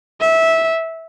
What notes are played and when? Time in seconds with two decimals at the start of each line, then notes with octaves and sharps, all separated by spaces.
0.21 E5